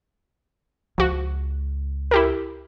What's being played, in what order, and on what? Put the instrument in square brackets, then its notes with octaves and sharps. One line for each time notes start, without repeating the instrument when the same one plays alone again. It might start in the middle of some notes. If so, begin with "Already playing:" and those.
[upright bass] C#2 [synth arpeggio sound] F3 F#4
[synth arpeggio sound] E4 G4 A#4